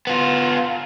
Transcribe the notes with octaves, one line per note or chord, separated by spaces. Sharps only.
B3 F4